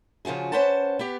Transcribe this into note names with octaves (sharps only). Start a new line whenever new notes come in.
C#3 F3 F4 F#4 G#4
C#4 B4 C5 F#5 A5
B3 G4